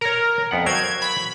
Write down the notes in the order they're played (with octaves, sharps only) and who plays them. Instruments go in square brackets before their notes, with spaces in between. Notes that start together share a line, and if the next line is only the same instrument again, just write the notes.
[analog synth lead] A#4 [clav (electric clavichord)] C#5 A#5
[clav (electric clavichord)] F2 B3 F#5
[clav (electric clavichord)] F#3 A#4 C5 [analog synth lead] G#6
[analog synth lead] B5